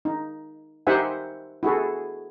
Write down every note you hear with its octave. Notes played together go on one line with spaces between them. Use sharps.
D#4
D#4 G4 C5 E5 F#5 G#5
E4 F#4 G#4 A4